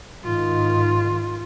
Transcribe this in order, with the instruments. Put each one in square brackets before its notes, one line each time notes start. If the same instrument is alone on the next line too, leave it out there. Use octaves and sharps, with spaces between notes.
[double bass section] G#2 D#3 [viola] F4